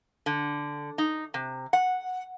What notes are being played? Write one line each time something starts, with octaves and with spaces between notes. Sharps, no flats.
D3
D#4
C3
F#5